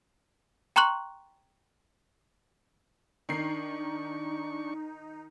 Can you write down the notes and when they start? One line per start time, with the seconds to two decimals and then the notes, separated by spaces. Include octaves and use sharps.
0.76 G5 A#5 C6 C#6 F#6 F#7
3.29 D#3 D4 D#4 C#6 C7